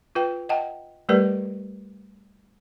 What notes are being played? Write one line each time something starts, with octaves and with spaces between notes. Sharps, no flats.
F4 B4 G5
D#5 F#5 G5 A5
G3 A3 G4 A#4 B4 D5